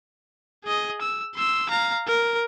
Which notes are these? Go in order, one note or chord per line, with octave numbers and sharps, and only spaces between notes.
G#4 D#5
E6
C6 E6
F5 A#5
A#4